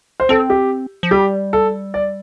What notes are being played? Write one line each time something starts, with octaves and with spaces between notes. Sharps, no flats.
C5
C4 A4
G4
F3
G3 G4
A4
D5